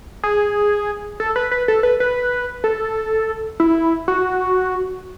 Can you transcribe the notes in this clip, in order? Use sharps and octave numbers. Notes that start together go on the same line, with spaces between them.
G#4
A4
B4
B4
A4
B4
B4
A4
E4
F#4